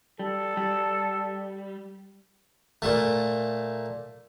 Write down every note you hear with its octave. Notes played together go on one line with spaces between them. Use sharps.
G3 A4
G3
A#2 A3